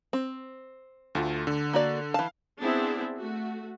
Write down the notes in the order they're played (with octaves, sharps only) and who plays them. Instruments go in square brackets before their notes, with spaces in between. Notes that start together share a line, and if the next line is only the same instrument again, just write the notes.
[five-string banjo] C4
[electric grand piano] D2 A3 F4
D3
[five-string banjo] A#3 F#4 D5
[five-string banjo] E3 A5 [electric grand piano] F5
[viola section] B3 C4 D4 E4 G#4
A3 F#4